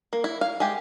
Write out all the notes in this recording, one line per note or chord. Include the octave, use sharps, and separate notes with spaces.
A#3
E4
F5
G#3 G4